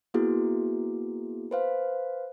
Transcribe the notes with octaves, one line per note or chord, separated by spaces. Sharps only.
A#3 B3 E4 F#4 G#4
B4 C5 F5